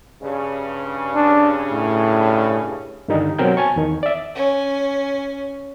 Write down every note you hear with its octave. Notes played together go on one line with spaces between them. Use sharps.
G2 C#3
D4
A2
G2 D3 D#3 G3 D#4
B2 F#3 C4 A#4 G5 G6
G#5 A5 C#6
E2 D#3
D5 E5
C#4